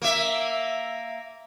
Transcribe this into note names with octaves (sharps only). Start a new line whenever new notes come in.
A#3 E5